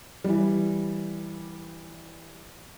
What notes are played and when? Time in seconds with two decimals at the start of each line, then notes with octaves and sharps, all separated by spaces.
0.24 E3 G3